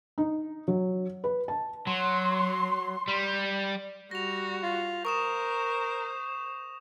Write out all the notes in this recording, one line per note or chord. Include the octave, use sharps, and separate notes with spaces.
D#4
F#3
B4
A5
F#3 C6
G3
G3 F#4 A#6 F7
F4
A#4 C5 C#6 D#6 E7